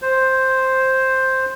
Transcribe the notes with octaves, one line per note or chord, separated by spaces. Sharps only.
C5